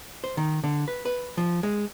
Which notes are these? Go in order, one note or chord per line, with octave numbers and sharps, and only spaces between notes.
C5
D#3
D3
B4
B4
F3
G#3